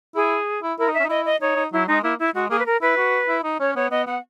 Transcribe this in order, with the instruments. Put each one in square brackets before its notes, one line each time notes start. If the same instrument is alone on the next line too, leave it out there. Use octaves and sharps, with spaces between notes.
[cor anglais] E4 [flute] G#4
[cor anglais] E4
[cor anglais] E4 [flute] A#4
[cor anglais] D#4
[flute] E5
[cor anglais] C#4
D#4
[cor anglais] E4 [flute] D#5
[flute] D#5
[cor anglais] D#4 [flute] C#5
[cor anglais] D#4
[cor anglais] F#3 [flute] E4
[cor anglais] G#3 [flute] D#4
[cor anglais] A#3 [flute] E4
[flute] E4
[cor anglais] G#3 [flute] F#4
[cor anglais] A#3 [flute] G#4
[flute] B4
A#4
[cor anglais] E4 [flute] B4
[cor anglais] F#4
E4
D#4
[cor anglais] C#4 [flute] C#5
[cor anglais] B3 [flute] C#5
[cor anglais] B3 [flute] D#5
[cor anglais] B3 [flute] F#5